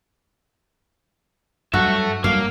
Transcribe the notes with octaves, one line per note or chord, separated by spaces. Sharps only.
G2 F#3 F#4 A4 E5
G2 F#3 A#3 F5